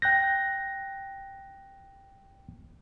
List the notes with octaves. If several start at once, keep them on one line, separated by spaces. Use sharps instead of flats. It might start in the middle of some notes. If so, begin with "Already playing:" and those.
G5 F#6 G6 A#6